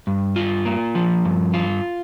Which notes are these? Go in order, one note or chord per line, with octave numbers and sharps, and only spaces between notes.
G2
F4
A#3
F3
G2
F4